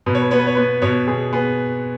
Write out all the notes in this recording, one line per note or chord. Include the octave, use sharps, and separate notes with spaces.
B2 B4
C#5
B4
B3 C#5
B4
C#5
B3 B4
B2 C#5
B2 G#4
B3 G#4